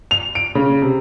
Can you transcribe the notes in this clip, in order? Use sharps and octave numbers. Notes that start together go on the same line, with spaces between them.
F7
D7
C#3
C3